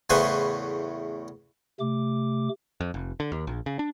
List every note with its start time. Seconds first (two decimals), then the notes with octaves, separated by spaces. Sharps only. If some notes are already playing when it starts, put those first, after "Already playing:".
0.10 E2 A2 C#3 B4 C5 G#5
1.80 C3 A3 D6
2.80 F2
2.94 F1
3.20 D3
3.32 D#2
3.47 A#1
3.66 C#3
3.79 D4